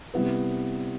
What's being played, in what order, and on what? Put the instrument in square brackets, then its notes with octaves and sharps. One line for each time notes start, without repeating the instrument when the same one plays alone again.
[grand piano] C3 G3 B3 E4 B4